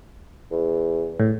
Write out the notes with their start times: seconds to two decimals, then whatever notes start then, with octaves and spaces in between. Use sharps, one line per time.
0.52 E2
1.20 A2